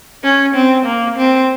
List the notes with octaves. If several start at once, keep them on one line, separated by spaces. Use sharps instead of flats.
C#4
C4
A#3
C4